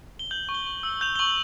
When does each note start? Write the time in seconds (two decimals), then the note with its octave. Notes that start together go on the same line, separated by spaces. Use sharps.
0.19 G7
0.31 G6 F#7
0.49 C#6
0.54 G7
0.66 C#6
0.83 E6
1.01 G6 F7
1.15 G7
1.19 C#6 F#7